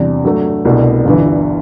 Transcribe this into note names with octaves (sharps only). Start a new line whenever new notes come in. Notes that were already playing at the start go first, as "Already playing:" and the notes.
Already playing: E2 C3 G3 D4
G2 F#3 A3
C2 B2 A3 D4
G1 G2 E3